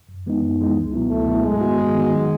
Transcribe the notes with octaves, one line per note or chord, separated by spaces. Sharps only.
F#2
E3 G#3 B3 D#4
F#2
E3 G#3 B3 D#4
C#2
B2 F#3 B3 E4
C#2 A3
B2 F#3 B3 E4
G#2 G#3
D#3 F#3 B3 F#4
G#2
D#3 F#3 B3 F#4
D#3